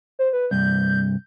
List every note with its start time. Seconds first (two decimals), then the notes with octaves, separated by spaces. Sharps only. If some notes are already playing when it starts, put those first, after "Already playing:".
0.19 C5
0.33 B4
0.51 C2 G2 G6